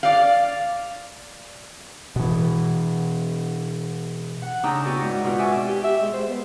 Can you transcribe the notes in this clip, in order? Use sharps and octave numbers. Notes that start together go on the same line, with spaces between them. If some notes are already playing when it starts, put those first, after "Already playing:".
D5 F5
B2 E3
F#5
C#3 D4 D#4 G5 A#5 E6
B3 E4 F#4 D5 D#5
G#2
B2 C4 F4 F#4
D5 E5 G#5 C#6 E6
G4
E5
G#3
C5
B3